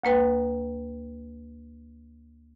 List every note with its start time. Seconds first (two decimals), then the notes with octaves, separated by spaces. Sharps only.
0.04 D2 A#3 B4 G5